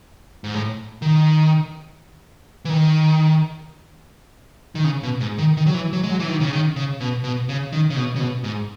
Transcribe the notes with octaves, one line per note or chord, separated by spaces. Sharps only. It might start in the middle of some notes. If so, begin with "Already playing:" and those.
G#2
A2
D#3
E3
D#3
D#3
C#3
B2
G#2
D#3
D#3
F#3
E3
F#3
G#3
F#3
E3
D#3
C#3
D#3
C#3
B2
B2
C#3
D#3
C#3
B2
C#3
B2
G#2